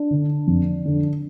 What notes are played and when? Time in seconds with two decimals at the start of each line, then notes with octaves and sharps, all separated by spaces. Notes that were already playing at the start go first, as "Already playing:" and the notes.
Already playing: D4
0.11 D3
0.47 F2
0.85 D3